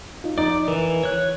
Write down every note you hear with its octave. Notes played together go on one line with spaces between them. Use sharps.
D#4 F4
F2 D#4 D5
E3 A#4
C#5 F#6